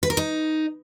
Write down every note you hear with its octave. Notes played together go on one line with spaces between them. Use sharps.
B4
A#4
D#4